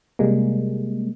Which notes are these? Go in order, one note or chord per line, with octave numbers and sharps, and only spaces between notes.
C3 G3 G#3 A#3